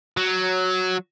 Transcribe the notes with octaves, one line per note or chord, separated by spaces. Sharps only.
F#3